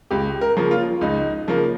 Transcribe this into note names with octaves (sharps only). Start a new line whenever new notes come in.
C#2 G4
A#4
C#3 F3 A#3
F4
C#2 D#4
C#3 F3 A#3